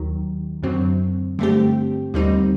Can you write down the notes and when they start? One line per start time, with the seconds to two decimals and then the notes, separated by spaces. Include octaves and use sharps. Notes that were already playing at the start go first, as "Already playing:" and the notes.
Already playing: D#2 D#3 F#3
0.63 F#2 D3 F#3 C4
1.39 G2 D3 A3 C4 G4
2.14 D#2 D3 G3 C4 D#4